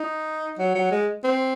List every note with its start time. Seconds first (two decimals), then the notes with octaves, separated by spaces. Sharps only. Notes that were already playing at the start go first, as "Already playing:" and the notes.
Already playing: D#4
0.59 F#3
0.75 F#3
0.91 G#3
1.24 C4